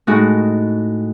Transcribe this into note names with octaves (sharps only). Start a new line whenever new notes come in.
A2 G#3 D#4 F#4